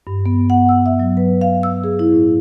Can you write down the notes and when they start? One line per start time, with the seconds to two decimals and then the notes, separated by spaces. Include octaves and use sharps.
0.07 G2
0.26 B3
0.50 F#5
0.69 E6
0.86 E5
1.00 F#3
1.17 B4
1.41 F5
1.63 E6
1.84 G#4
1.99 E4
2.12 A2